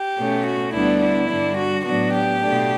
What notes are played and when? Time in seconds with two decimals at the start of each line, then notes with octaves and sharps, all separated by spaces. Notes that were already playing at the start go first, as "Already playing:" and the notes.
Already playing: G4
0.16 B2 A3 C#4
0.45 F#4
0.73 D2 D3 G3 B3 D4 E4
1.01 E4
1.29 G2 D3 G3 D4
1.57 F#4
1.85 A2 F#3 B3 D4 F#4
2.14 G4
2.41 B2 A3 D4